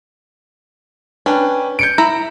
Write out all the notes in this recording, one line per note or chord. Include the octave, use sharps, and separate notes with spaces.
C#4 D4 B4 G5
G6 C#7 D7
E4 A#5